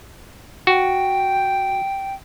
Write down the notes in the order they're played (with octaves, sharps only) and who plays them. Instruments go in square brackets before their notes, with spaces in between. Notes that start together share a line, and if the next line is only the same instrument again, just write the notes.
[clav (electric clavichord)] F#4 [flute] G5